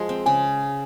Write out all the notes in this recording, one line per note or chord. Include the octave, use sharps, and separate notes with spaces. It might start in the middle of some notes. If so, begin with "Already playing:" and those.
Already playing: F3 G#3
C4
C#3 G#5